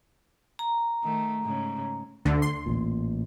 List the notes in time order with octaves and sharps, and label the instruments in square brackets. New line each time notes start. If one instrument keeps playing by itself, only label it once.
[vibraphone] A#5
[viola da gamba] D#3 A3
G#2 C#3
[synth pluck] D2 D3
C6
[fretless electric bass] A1 A#2